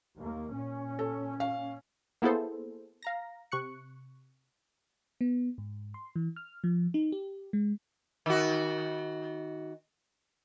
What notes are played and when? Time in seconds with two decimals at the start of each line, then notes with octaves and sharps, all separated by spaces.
0.16 D#2 A#3
0.54 A#2 C#4
0.99 A4
1.40 F5
2.22 A#3 B3 E4 G#4 A4 C5
3.03 F5 A#5 A#6
3.52 C3 C#6 F#6 C#7
5.21 B3
5.58 G#2
5.94 C6
6.16 E3
6.36 F6
6.64 F3
6.94 D#4
7.12 G4
7.53 G#3
8.26 D#3 F#4